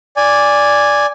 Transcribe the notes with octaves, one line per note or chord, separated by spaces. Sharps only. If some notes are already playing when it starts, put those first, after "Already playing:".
D5 G#5